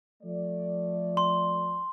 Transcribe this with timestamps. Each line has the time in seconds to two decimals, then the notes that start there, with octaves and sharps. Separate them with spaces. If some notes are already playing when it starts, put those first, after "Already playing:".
0.23 F3 A3 D5
1.17 C6